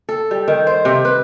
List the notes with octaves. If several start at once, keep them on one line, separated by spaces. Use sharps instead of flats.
A4
G3
D#3
C5
C3
B4